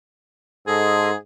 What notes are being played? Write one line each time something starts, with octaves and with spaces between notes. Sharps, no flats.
G#2 G#4 A4 D#5 C6